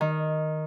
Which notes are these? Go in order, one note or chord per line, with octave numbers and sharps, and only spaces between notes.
D#3